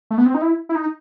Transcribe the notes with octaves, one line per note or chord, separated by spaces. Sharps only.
A3
B3
C4
D#4
E4
E4
D#4